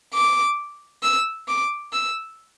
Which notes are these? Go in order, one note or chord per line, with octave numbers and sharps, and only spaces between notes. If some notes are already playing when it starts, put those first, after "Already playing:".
D6
E6
D6
E6